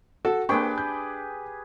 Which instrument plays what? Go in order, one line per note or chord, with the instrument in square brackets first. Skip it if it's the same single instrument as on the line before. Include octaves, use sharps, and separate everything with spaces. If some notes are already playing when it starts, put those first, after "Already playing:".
[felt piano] F#4 [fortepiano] A4
[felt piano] A#3 C5 C#6 [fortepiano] D4 G5 [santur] G4 G#4 B4
[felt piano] G6